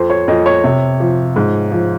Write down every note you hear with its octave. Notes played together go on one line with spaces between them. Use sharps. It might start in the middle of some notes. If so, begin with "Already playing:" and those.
Already playing: F2 C5
C#5
F2 D#5
C#5
C3
F3
G#2
F3